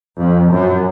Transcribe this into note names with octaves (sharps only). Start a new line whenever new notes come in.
F2
F#2